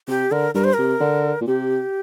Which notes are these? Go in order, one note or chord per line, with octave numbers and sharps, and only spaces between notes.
C3 G4
D3 A#4
G2 A#4
C5
C3 A#4
D3
A#2
C3 G4